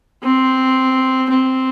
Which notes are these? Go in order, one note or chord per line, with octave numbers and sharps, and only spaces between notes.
C4
C4